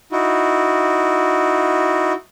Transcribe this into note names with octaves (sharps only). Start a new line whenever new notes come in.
D#4 E4 F#4